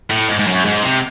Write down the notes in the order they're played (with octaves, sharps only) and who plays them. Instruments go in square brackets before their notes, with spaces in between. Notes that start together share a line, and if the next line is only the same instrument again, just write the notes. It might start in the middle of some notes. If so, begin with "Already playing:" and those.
[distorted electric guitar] A2
G#2
G#2
F#2
G#2
C3